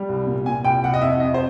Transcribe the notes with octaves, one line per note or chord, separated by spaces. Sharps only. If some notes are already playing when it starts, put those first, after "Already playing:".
Already playing: G3
C2
A#2
A#2 G#5
C2 G5
C2 F#5
D#5
F2 E5
F2 D#5
C5